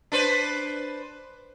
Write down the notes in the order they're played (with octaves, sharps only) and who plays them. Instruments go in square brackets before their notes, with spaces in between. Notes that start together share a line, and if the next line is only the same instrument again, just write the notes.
[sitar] D4 B4 C5